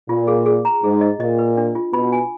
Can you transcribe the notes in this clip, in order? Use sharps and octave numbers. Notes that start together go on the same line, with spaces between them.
A#2 F4
G#4
G#4
A#5
G#2 G#4
D#5
A#2 D#5
B4
D4
F4
B2 B5
G#5